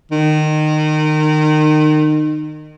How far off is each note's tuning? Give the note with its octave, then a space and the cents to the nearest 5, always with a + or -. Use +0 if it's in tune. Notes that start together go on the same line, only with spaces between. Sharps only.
D#3 -25